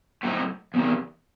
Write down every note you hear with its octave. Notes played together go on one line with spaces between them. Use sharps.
A2 F#3 A3 C4 D#4
E2 C3 D#3